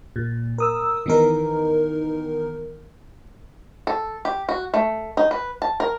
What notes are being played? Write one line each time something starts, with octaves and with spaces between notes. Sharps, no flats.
A#2
A#4 D#6 E6
D#3 E3 B3 D#4 A#4
A4
G4
F#4
A3
D#4
B4
A5
A#4